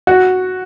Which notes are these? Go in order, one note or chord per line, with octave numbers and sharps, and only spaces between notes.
F#4